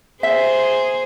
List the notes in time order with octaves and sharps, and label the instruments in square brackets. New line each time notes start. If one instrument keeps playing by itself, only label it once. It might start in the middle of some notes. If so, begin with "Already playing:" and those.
[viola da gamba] G#4 C5 [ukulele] E5